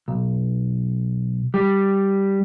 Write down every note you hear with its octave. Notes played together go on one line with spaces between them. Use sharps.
B1
G3